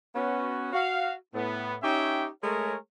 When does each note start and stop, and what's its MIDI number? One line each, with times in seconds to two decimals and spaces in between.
0.16 0.72 59
0.16 0.72 61
0.16 0.72 66
0.73 1.13 66
0.73 1.13 77
1.34 1.76 45
1.34 1.76 59
1.83 2.28 61
1.83 2.28 63
1.83 2.28 67
1.83 2.28 73
1.83 2.28 76
1.83 2.28 79
2.43 2.76 56
2.43 2.76 57
2.43 2.76 68
2.43 2.76 70
2.43 2.76 73